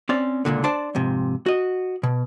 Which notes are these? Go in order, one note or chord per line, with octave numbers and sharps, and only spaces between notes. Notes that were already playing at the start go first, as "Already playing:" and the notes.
C4 C#4 D5
C#2 F#2 A#2 D3
D4 C5 D5 A5
F2 G#2 C3
F#4 D#5
B2